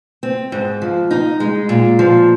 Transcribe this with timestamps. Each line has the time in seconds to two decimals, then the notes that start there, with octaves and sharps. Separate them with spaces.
0.23 C4
0.52 G#2
0.82 F3
1.11 D#4
1.40 G#3
1.69 A#2
1.99 F3